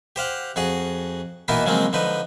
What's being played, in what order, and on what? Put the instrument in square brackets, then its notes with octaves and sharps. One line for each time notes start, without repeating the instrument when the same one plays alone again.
[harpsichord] G4 C5 F5 F#5
F2 F#4 G#4 F#5
B2 E3 A#3 B3 D#4 E4
C#3 F3 F#3 G#3 A#3 C4
D3 F3 D#4 B4